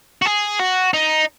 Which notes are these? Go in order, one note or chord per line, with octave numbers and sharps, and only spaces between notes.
F#4
G#4
F#4
D#4